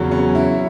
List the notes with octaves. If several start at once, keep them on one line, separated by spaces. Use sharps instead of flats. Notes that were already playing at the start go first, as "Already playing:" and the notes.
Already playing: E2 C#3 F#3
C#4
E4